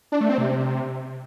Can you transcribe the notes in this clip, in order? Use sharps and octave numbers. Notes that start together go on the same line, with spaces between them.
D4
A3
C4
C3